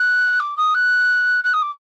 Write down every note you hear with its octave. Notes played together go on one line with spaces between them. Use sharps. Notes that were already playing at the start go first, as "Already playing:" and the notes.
Already playing: F#6
D6
D#6
F#6
F#6
D#6
D6